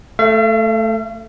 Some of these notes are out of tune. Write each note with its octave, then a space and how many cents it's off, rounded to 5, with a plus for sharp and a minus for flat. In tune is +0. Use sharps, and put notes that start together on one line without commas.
A3 +0 F5 -45